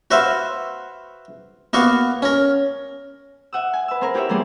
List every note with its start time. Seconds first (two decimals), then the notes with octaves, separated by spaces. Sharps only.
0.11 F#4 B4 C5 E5 F5
1.73 A#3 B3 F#4 F5 C#6
2.22 C#4 A#4
3.53 E5 F#5 D#6 E6
3.73 G#5
3.88 B4 E6
4.01 C4 G#4 A#4
4.14 E4 G4 G#4 C#5 E5
4.29 E3 G3 A#3 B3 G4 G#4